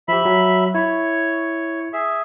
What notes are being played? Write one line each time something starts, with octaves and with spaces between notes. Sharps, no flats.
F3 G4 E5 B5
F#3
E4 C#5
G#4 E5